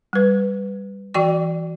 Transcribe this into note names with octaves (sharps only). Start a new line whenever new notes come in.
G3 B4
E3 F#4 D5 G5 C#6